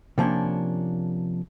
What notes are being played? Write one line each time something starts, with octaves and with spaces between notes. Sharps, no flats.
C3 F3 A#3 C#4 D4